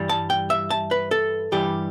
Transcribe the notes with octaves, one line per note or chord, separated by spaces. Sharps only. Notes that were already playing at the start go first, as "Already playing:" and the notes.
Already playing: G2 E3 G3
A5
G5
E5
A5
B4
A4
G2 E3 G3 G4